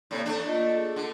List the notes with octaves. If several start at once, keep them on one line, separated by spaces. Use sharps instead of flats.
A2 C3 A#3 D5
A3 D4
F4 D#5
G#4
D3